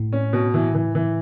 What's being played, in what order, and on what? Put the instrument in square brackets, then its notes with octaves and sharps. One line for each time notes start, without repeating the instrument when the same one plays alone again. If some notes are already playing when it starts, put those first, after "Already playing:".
Already playing: [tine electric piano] A2
[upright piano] C#4
B2
E3
E3
E3